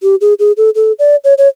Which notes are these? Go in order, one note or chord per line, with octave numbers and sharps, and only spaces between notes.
G4
G#4
G#4
A4
A4
D5
C#5
C#5